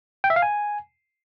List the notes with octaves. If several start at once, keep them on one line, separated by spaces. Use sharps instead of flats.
G5
E5
F5
G#5